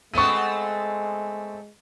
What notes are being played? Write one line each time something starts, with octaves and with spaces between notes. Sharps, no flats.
G#3 A3 B3 C4 C#6 D#7